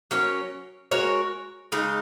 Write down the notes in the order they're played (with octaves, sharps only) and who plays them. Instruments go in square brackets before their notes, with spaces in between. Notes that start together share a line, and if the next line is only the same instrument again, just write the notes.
[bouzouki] F#3 C#4 A#4 C#5
G#3 F#4 A#4 C#5
C#3 G#3 D#4